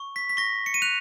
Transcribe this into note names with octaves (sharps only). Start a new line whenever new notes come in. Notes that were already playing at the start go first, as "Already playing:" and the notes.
Already playing: C#6
B6
B6
C#6 A#6
C#7
D#7
F#6 F7